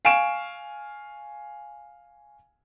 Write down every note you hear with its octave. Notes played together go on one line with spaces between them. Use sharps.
F5 G#5 C#6 D7 E7